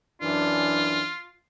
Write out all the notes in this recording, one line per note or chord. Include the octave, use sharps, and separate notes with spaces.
F#2 E3 D4 F4